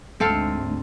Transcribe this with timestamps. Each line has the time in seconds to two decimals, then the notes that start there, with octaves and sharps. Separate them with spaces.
0.20 D2 G#2 C4 A4 F5